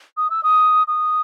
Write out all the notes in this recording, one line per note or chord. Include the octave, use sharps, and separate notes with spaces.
D#6
E6
D#6
D#6